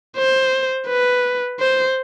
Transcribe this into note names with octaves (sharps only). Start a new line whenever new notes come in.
C5
B4
C5